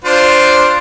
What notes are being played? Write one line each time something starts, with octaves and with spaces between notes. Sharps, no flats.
D4 F4 C5